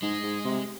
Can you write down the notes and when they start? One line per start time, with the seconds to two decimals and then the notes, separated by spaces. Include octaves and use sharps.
0.02 G#2 G#3
0.23 G#2
0.45 C3